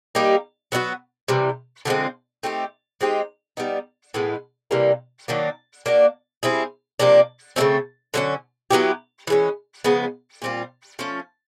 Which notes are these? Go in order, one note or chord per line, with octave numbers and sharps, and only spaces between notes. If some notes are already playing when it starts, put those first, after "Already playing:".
G3 A#3 D#4 G4
F#3 B3 D#4 F#4
C3 E3 G3
D3 F3 G#3 C4
A3 C4 D#4 G4
G#3 C4 D#4 G4
G3 B3 D#4
A2 E3 G#3 B3
C3 E3 G3 A#3
D#3 F#3 A#3 D4
A#3 D4 F#4
G3 C4 E4 G#4
C3 F3 A#3 D4
C#3 F3 A3 C4
D3 F#3 A3 C#4
F#3 B3 E4 G4
E3 G#3 C#4
C#3 F3 G#3 B3
A#2 G3 C4 F4
F3 A3 C#4